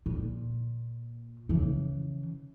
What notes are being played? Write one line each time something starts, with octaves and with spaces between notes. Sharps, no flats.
A#2
C#3 E3